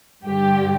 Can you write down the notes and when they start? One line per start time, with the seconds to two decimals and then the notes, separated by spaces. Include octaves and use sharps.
0.24 G2 D3 G4